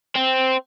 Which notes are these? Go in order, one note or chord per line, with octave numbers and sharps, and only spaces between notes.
C4